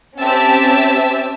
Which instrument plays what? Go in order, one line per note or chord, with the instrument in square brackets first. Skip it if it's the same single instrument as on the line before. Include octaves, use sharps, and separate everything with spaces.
[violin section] C4 C#4 G4 E5 A5 E6